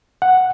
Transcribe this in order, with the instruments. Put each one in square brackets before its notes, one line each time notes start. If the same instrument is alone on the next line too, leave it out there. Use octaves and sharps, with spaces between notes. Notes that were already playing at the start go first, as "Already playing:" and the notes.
[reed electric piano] F#5